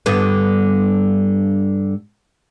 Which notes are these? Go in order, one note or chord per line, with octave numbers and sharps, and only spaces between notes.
G2 D3 B3